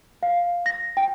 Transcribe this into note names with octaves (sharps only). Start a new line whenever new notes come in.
F5
A#6
G5